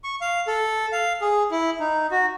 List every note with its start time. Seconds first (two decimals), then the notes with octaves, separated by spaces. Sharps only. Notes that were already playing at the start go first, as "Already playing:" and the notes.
0.04 C#6
0.21 F5
0.47 A4
0.92 F5
1.21 G#4
1.51 E4
1.80 D#4
2.11 F#4